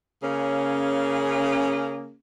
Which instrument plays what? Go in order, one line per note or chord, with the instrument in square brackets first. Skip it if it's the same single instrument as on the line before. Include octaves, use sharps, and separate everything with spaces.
[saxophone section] C#3 A#3 C#4 G#4